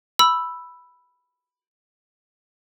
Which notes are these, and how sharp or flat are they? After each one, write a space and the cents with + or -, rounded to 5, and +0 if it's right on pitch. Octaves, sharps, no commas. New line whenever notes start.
B5 +0 E6 +5